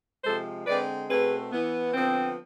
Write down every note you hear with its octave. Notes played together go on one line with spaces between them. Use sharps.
C3 F3 G#3 A4 C5
D3 G#3 C4 B4 D5
B2 A3 C4 G#4 B4
E3 B3
D3 F3 B3 C4